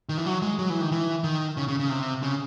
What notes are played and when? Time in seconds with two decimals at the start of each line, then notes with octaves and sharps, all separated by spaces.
0.09 D#3
0.17 E3
0.26 F#3
0.42 G#3
0.59 F#3
0.70 E3
0.81 D#3
0.92 E3
1.24 D#3
1.57 C#3
1.68 C#3
1.79 C#3
1.90 C3
2.23 C#3